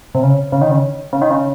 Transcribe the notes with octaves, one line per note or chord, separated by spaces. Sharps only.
C3
C#3
C#3
D#3
C#3
C#3
D#3
C#3